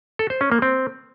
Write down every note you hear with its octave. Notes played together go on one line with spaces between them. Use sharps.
A4
C5
C#4
A#3
C4